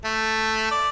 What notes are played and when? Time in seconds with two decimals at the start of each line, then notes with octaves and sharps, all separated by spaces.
0.05 A3
0.71 D5